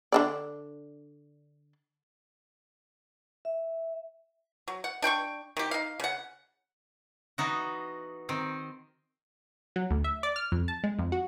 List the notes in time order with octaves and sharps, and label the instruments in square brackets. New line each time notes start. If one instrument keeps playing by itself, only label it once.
[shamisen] D3 D4 D5
[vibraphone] E5
[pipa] F#3
F#5
D4 G5 C6 C#6
D#3 G4
D#4 F5
C#3 F#5
[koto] E3 B3 D#4 F#4
D#3 C4
[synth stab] F#3
D2
E5
D5
F6
F2
A5
G#3
F2
F#4